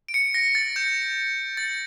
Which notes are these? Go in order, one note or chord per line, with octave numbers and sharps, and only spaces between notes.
D7
C#7
A#6
A6
G6
A6